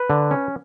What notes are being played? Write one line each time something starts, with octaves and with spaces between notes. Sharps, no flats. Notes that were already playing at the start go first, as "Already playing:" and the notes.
Already playing: B4
D3
C#4